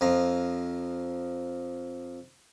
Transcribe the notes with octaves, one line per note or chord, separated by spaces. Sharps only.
F2 F3 A#5